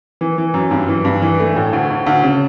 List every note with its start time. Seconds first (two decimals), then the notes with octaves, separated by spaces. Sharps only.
0.21 E3
0.38 E3
0.54 F#2
0.71 G2
0.89 E3
1.05 G2
1.22 E3
1.40 A3
1.56 A2
1.73 D2
1.90 D2
2.06 D2
2.23 C#3